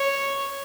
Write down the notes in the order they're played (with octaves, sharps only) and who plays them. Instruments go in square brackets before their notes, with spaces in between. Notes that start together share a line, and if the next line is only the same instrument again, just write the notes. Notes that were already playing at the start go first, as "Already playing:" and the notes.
Already playing: [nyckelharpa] C#5